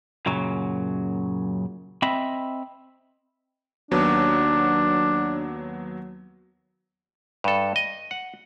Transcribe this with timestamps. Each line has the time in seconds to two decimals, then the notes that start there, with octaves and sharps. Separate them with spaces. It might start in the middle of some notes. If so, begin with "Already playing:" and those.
0.26 F#2 A#2 C#3 F#3
2.02 C4 D#5 E5 B5
3.91 D#2 F#3 B3 D4
7.44 G2 A4
7.76 D#5
8.11 F#5